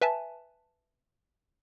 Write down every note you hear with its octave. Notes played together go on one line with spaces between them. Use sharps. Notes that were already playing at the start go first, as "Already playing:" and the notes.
B4 E5 G#5 A5